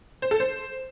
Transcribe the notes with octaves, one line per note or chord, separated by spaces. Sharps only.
C5
A4
C5